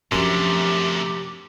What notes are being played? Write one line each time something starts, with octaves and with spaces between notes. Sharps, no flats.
F#2 C3 F3 A3 D4 G4